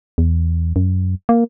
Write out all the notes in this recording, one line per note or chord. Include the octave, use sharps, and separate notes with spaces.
E2
F#2
A#3